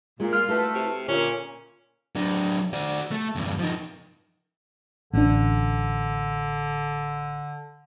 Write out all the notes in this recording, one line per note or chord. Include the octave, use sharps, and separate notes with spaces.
A#2 G#3
F4 F6
A3 E4 F#4 B4
C3
A#2 D3 C#4
F#3 D4
F#4 D5
A3
E2 G2
F3 D#4
A1 D3 D4